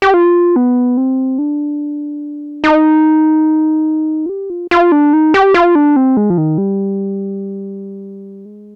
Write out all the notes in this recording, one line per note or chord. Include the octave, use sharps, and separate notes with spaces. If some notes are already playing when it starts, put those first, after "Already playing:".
G4
F4
B3
C4
D4
D#4
F4
G4
F4
F4
D4
D#4
G4
F4
D4
C4
G#3
F3
D#3
G3
G#3